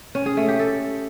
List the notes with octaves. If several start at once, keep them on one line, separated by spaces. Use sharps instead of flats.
C#4
G#4
A3
G4
A4